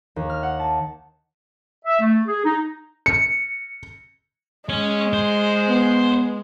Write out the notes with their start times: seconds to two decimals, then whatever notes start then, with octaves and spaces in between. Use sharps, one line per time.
0.16 D#2
0.30 F6
0.43 F#5
0.60 A5
1.85 E5
2.00 A3
2.27 G#4
2.45 D#4
3.06 C#7
4.69 G#3 C#4
5.13 C5
5.69 B3